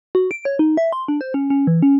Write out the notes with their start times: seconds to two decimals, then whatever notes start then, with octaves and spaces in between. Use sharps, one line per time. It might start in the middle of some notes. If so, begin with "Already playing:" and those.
0.15 F#4
0.31 D7
0.45 C#5
0.59 D#4
0.77 E5
0.93 C6
1.08 D4
1.21 C5
1.34 C#4
1.50 C#4
1.67 E3
1.82 C#4